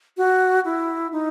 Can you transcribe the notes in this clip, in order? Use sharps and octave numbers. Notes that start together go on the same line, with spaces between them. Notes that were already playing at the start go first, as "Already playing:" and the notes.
F#4
E4
D#4